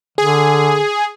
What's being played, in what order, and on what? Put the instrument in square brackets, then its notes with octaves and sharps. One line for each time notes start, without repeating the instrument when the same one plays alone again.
[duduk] D3 [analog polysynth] G#4